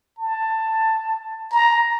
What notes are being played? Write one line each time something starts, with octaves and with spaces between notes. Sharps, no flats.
A5
A#5